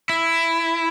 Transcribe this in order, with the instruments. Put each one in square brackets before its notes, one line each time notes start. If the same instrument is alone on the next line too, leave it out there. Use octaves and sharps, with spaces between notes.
[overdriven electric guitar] E4